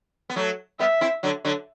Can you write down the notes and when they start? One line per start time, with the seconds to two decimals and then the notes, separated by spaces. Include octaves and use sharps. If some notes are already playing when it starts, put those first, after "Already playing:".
0.30 B3
0.36 F#3 A3
0.79 G3 B3 E5
1.01 C4 E4
1.23 D3 F#3
1.45 D3 F#3